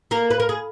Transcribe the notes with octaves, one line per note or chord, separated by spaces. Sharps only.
A#3 A#4
B4
A#4
G#4